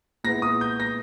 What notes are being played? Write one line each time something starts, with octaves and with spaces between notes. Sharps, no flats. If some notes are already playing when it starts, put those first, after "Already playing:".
A#2 G#3 B3 E4 A#6
D#6
G6
A#6